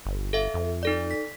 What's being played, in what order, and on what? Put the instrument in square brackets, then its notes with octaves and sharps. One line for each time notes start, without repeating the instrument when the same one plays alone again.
[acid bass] G1
[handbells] A4 E5 F5
[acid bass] F2
[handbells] D#4 A4 D5
B6